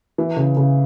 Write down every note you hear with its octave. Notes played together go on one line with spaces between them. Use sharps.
E3
C#3
C#3